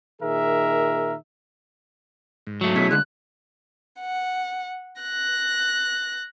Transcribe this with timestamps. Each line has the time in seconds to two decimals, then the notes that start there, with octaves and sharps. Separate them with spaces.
0.22 A#2 D#3 G#4 A#4 E5
2.47 G#2
2.61 F#3 A3
2.76 B2 C#4 E4 G#4 B6
2.91 D3 G#3 F#6
4.00 F#5
5.01 F#6 A#6